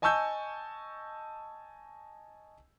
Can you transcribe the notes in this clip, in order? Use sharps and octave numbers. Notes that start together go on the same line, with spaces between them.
D#5 G#5 A5 C#6 E6 G6